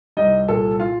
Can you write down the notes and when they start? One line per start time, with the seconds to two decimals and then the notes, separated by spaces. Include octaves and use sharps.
0.17 C2 D#4 D#5
0.48 A#2 A4 A5
0.80 F4 F5